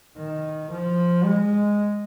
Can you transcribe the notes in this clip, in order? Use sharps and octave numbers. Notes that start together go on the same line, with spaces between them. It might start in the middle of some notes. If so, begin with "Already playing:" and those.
D#3
F3
G#3